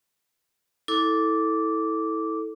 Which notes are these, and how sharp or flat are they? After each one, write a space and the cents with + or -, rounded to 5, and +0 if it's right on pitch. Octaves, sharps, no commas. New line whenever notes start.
E4 -25 A4 +0 D6 -10